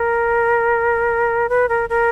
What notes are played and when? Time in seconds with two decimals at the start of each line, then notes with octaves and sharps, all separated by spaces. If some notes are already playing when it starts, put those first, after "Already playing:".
Already playing: A#4
1.49 B4
1.69 A#4
1.89 A#4